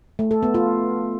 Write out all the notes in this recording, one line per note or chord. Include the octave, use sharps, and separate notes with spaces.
A3
A4
B3
F4